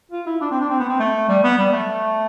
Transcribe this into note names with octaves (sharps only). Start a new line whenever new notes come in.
F4
E4
D4
C4
D4
C4
B3
C4
A3
G3
B3
G3
A3